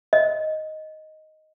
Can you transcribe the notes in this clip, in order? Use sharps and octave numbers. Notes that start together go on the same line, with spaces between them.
D#5